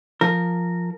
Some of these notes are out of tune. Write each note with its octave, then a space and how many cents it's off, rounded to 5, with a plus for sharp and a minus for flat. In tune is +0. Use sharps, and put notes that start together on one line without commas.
F3 +0 A#4 -10